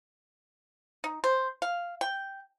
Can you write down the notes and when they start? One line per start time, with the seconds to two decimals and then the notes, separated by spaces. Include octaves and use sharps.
1.04 D#4
1.24 C5
1.62 F5
2.01 G5